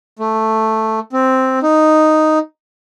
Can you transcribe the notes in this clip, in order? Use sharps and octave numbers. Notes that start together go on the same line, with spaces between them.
A3
C4
D#4